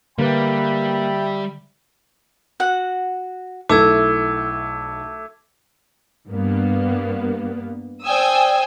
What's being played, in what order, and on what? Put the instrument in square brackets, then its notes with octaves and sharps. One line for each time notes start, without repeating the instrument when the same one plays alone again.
[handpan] D3 [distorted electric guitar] G3 [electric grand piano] A#3 B4 [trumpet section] E5 G5 B5
[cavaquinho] F#4 F#5
[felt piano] B1 E4 [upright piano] A3 [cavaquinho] E5 [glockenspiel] D6 E6 G#6
[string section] G2 A#3 B3
C5 D5 G5 G#5 D#6 E6